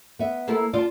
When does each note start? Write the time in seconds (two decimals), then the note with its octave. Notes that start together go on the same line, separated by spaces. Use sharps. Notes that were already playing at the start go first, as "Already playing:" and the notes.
0.19 B3 E5
0.48 A#3 E4 A4
0.73 F4 D5 A5